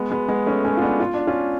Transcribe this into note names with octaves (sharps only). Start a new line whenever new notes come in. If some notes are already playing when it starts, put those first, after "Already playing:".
Already playing: G#3 B3
G#3 B3
G#3 B3
A3 C#4
A3 C#4
F4
B3 D4
F4
D4
C#4 F4